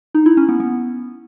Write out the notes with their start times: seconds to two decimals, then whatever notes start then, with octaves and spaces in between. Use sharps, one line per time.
0.15 D#4
0.26 E4
0.37 C#4
0.49 B3
0.60 B3